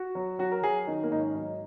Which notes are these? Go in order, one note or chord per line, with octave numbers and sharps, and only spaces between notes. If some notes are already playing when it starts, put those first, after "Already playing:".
Already playing: F#4
F#3
F#3 F#4
A#4
F#3 G#4
D#3 D#4
A#3
G#2 D#4
C#4
F#3 D#4